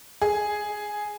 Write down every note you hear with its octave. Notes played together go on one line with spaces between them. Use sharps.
G#4